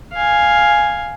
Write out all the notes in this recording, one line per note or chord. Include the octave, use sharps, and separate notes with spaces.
F5 G#5